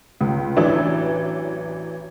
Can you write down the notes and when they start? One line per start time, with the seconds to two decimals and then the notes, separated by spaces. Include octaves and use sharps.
0.21 C#2
0.56 A1 E3 F#3 D4 E5